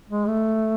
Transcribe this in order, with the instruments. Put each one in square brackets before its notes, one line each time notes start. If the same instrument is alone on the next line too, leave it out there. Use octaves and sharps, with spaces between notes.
[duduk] G#3
A3